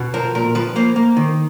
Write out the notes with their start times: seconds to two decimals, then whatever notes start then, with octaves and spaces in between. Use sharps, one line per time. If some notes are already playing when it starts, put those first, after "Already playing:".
Already playing: B2
0.14 F3 A#4
0.35 A#2 A#4
0.55 F3 B4
0.76 A#3 C5
0.96 A#3
1.17 D#3